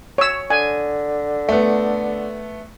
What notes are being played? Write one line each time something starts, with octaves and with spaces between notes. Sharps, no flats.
C#5 E6
D3 G#5
A3 B3